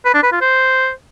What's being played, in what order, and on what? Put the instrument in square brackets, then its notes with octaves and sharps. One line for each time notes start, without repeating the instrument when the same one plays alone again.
[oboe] B4
D4
B4
F4
C5